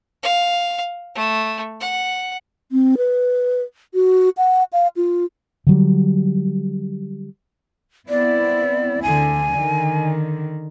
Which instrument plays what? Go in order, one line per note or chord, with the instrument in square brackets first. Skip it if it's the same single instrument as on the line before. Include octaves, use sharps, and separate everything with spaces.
[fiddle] F5
A3
F#5
[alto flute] C4
B4
F#4
F#5
F5
F4
[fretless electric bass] D3 F#3 G3
[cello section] B3 C4 E4 [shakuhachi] D5
[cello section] D2 D3 [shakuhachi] G#5
[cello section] D3 D#3